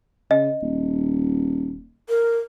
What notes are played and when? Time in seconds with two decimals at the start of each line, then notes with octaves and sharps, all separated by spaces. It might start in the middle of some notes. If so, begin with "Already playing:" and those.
0.31 C#3 D#5
0.63 D#1
2.09 A#4